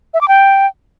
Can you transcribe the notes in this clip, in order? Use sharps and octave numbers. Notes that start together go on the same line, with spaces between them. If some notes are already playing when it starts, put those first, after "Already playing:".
E5
D6
G5